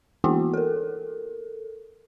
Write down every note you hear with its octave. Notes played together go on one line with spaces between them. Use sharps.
E3 A#3 B3 E4 F#4
A4 A#4